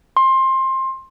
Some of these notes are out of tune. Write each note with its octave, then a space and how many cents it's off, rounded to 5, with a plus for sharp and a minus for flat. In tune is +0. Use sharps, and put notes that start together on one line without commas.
C6 +20